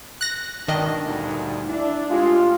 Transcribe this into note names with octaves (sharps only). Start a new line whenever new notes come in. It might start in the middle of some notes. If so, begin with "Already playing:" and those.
F#6 A#6
G#1 B2 D#3 D4 D#5
D2 G2 A#2 D#4
D4 E4
A2 G#3 F4 G4